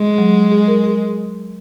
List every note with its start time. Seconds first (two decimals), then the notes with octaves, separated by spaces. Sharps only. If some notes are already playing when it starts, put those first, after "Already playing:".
Already playing: G#3
0.18 F#3
0.52 G#4
0.68 A#4
0.84 G#4